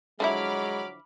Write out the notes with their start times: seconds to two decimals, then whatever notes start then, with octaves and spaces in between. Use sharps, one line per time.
0.20 D3 F3 F#3 G#3 E4 B5 D6 F6